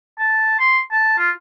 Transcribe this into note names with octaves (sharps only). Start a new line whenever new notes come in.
A5
C6
A5
F4